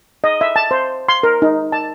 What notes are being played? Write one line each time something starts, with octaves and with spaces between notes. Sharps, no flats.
D#5
E5
A5
C5
C6
A#4
D#4
A5